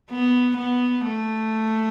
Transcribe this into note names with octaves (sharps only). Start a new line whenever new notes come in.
B3
B3
A3